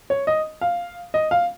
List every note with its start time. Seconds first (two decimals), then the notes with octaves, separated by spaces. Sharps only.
0.10 C#5
0.27 D#5
0.61 F5
1.14 D#5
1.31 F5